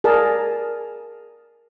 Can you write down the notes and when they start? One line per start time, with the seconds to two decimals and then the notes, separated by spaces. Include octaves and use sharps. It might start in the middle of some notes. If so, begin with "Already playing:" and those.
0.04 G#4 A#4 D5 A5